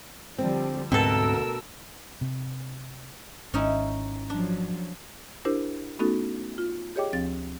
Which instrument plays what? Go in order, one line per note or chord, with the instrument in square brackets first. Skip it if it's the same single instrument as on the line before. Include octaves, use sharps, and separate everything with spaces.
[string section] D3 F3 G3 [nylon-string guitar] C4
[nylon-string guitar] D2 [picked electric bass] G#2 C4 [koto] B2 A4 [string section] A#4 E6
[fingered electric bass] C3
[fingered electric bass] G#1 [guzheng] C#4 D#4 E4
[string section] F3 F#3 [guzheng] D4
[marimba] D4 E4 G4 A#4 C5
A3 B3 C#4 D#4 F#4 A4
F4
G4 G#4 C#5 D#5 G5 D6
D2 F3 C4 A6